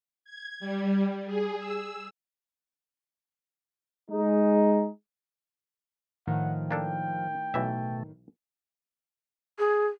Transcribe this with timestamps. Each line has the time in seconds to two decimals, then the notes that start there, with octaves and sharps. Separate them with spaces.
0.24 G#6
0.60 G3
1.26 G#4
1.59 E6
4.11 G#3 D#4
6.27 A2 D#3 F3 F#5
6.71 A#3 D4 A4 G5
7.54 B1 B2 E3 A3 E5
9.59 G#4